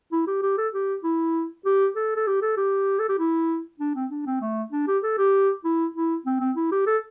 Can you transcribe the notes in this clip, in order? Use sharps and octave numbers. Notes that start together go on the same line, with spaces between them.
E4
G4
G4
A4
G4
E4
G4
A4
A4
G4
A4
G4
A4
G4
E4
D4
C4
D4
C4
A3
D4
G4
A4
G4
E4
E4
C4
C4
E4
G4
A4